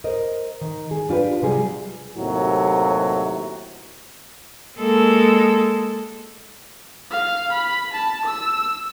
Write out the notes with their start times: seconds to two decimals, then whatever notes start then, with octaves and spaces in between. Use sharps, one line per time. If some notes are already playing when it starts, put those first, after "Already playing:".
0.04 A#4 C5 D#5
0.61 D#3
0.91 G#4
1.09 D4 F4 G4 B4
1.42 C3 F#3 G3 C4 G#4
2.17 D#2 A2 C3 F#3
4.79 G#3 A#3 A4
7.11 F5
7.52 B5
7.94 A5
8.26 E6